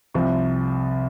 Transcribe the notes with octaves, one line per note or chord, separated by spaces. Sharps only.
C2 C3 F3